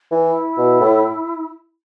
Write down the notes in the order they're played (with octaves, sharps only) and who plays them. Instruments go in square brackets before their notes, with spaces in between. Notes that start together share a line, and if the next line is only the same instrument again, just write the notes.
[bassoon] E3
[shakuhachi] E4
[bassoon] B2
A2